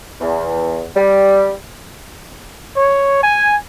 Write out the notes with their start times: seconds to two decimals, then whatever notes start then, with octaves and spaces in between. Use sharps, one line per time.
0.20 E2
0.96 G3
2.76 C#5
3.23 G#5